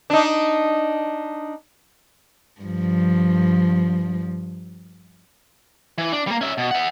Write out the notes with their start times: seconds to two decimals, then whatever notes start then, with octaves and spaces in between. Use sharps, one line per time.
0.10 D4 D#4
2.61 G2 F3
5.98 E3
6.13 D4
6.27 G3 A#3
6.41 C#4 E5
6.58 B2
6.71 E5 F#5